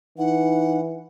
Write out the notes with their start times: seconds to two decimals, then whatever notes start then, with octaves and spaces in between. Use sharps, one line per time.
0.18 E3 D#4 F#5